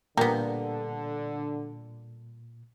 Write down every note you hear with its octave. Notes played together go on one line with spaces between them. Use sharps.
A#2 D3 G3 A#3 B3 A#5